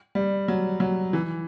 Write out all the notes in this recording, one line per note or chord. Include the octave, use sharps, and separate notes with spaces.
G3
F#3
F#3
E3